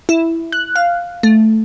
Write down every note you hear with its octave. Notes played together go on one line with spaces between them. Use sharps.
E4
F#6
F5
A3